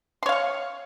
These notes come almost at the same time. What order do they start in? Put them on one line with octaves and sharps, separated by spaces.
C6 C#5 F5 C#6